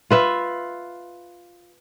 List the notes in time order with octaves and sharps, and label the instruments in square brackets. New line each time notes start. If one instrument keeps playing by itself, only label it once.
[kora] F4 B4 E5